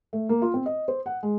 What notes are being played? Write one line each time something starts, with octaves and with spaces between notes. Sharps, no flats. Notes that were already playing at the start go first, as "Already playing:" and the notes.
A3
A#3
F4
C4
D#5
C5
F#5
G#3